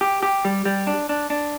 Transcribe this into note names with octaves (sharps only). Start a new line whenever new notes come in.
G4
G4
G3
G3
D4
D4
D4